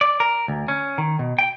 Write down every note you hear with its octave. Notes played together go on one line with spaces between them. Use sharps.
D5
A#4
D2
C#4
D#3
B2
G5